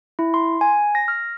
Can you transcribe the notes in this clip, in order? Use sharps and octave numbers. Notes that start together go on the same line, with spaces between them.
E4
C6
G#5
A#6
F6